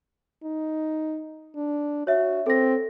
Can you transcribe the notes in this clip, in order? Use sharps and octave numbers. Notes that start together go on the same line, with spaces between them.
D#4
D4
F#4 C#5 E5
C4 A4 A#6